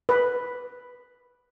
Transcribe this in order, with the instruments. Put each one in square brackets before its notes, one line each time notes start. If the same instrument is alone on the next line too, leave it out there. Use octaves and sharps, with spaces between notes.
[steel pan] B4